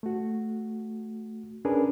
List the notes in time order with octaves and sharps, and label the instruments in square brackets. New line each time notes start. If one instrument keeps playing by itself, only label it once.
[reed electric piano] A3 F#4
C#4 D4 G#4 A#4 B4